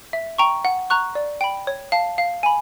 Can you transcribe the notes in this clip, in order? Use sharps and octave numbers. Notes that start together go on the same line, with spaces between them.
E5
G5 A#5 C#6
F#5
A#5 C#6 F#6
D5
G5 B5
C#5
F5 A5
F5
G#5 B5